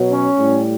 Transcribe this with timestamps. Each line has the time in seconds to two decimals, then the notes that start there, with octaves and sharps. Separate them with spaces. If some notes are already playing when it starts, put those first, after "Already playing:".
Already playing: B2 F#3
0.10 C#4
0.39 A2 G3